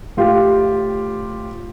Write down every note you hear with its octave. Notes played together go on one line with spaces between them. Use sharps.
A2 F4 G4